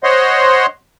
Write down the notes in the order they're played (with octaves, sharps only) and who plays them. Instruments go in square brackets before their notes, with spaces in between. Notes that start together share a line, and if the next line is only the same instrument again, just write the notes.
[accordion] C5 C#5 D#5 F#5 C6